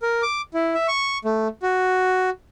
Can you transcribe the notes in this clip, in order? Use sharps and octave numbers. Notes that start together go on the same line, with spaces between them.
A#4
D6
E4
E5
C#6
A3
F#4